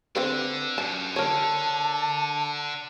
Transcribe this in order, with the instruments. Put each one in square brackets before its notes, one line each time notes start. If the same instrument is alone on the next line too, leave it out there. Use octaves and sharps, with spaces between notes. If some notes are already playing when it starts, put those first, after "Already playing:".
[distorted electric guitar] D3 D4 [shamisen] C4 A4 B4
[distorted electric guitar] F#2 [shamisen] A5
[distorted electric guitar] D3 [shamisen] A#4 C#5 [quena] A5